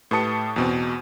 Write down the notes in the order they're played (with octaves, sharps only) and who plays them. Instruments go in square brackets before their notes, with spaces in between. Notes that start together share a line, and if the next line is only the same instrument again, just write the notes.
[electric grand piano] A2 G4 B4 A5 D#6 C#7
E2 B2 C4